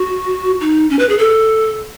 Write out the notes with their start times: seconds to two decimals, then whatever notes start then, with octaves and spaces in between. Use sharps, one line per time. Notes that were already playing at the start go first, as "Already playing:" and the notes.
Already playing: F#4
0.60 D#4
0.90 C#4
0.99 B4
1.09 G#4
1.18 A4